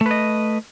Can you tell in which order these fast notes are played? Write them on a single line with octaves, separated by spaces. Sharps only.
A3 B4 D#5